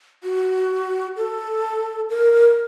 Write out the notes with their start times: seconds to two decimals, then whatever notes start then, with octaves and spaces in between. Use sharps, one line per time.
0.24 F#4
1.17 A4
2.10 A#4